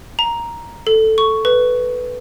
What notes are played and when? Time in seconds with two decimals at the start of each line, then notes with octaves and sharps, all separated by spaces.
0.19 A#5
0.87 A4
1.18 C#6
1.45 B4